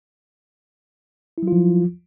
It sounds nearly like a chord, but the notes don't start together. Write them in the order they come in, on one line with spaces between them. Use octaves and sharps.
E4 F#3 F4 F3